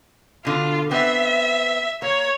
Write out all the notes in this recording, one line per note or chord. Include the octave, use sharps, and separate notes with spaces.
B2 D3 F4
B3 C4 E5
A#3 C#5